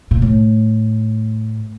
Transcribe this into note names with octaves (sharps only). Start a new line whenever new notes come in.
A#2
A2